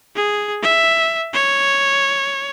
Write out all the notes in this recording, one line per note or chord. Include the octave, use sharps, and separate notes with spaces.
G#4
E5
C#5